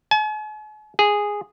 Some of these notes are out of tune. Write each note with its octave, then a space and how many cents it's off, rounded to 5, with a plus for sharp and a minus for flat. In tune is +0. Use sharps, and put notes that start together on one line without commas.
G#5 +45
G#4 -5